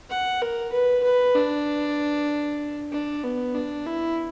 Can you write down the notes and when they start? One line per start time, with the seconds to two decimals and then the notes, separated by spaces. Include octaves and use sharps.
0.10 F#5
0.42 A#4
0.72 B4
1.04 B4
1.35 D4
2.92 D4
3.23 B3
3.55 D4
3.86 E4